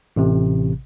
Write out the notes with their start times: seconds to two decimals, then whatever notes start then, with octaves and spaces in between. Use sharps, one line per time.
0.16 A1 C3